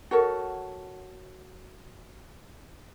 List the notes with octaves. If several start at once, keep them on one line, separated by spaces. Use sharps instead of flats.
F#4 A4 A#4 C#5